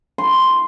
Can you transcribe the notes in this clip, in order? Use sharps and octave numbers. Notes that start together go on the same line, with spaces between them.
C6